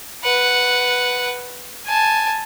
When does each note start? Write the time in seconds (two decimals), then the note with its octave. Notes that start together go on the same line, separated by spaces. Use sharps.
0.24 B4 F#5
1.86 G#5 A5